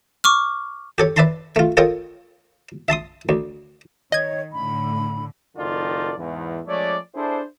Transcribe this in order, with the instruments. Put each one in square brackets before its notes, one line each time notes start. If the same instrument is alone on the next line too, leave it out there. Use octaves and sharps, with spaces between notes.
[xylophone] C#6 D6 F6
[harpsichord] G4 A4 C#5
B4 D5 E5 A5 A#5 C6
A3 F4
F4 A4 A#4 C#5 D#5 G5
E5 A5 C6 D#6
D2
[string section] D#3 [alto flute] C#5 [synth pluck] D#5 G#6
[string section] A2 D3 [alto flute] B5
[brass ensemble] F#1 F#2 D#3 F4 A4 D5
E2 G#2
F3 G#3 A3 C#4 C#5 D5
D4 E4 G#4 A4 C5